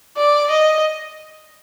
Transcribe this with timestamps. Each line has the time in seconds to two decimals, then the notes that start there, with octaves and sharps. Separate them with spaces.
0.17 D5
0.50 D#5